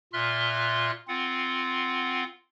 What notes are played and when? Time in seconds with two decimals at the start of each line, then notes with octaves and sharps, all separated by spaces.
0.13 A#2 F4 E5 C6 F6 F#6
1.08 C4 F4 F#5